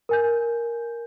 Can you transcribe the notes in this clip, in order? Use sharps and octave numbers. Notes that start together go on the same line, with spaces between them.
A#4 G#5 G6